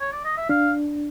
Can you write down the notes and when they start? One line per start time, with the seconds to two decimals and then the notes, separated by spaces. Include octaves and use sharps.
0.00 C#5
0.12 D5
0.25 D#5
0.38 E5
0.49 D4 F5